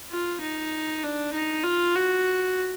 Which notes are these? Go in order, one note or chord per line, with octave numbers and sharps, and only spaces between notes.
F4
D#4
D4
D#4
F4
F#4